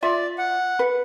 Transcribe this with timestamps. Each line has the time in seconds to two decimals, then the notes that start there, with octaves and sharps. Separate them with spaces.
0.03 F4 D5 E5
0.38 F#5
0.79 B4